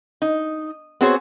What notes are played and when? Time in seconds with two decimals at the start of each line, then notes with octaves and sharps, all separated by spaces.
0.22 D#4
1.01 B3 C4 F#4 G#4 C5 C#5